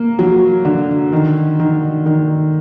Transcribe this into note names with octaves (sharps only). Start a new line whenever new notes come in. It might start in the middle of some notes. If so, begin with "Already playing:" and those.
Already playing: A#3
F#3
D3
D#3
D#3
D#3